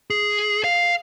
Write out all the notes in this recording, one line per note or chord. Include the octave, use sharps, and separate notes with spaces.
G#4
F5